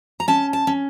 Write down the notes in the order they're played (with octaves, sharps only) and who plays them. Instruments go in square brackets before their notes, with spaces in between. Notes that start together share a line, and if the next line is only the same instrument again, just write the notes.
[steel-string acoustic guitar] A#5
C#4 A5
A5
C#4